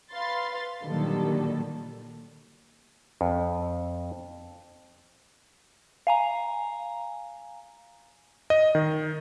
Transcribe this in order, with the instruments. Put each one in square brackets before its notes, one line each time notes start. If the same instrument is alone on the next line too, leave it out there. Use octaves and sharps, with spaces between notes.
[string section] B4 F5 C6 A6
A#2 D3 D#3 F#3 G3 A4
[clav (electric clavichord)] F2
[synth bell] F5 G#5 A#5
[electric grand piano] D#5
D#3